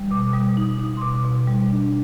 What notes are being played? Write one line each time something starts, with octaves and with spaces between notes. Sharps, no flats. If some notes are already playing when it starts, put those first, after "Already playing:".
Already playing: G3
B2 D6
G3 D#6
D#4
D#4
C6
B2 D6
B2
G3
D4